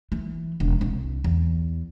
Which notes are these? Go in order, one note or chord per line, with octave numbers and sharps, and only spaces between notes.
E3
E1
C2
E2